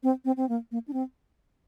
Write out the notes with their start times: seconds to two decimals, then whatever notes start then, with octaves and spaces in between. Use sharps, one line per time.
0.03 C4
0.25 C4
0.37 C4
0.49 A#3
0.72 A#3
0.88 D4
0.93 C4